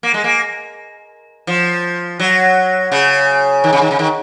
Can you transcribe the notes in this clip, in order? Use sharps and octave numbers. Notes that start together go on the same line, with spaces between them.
A#3
G#3
A#3
F3
F#3
C#3
D#3
C#3
D#3
C#3
D#3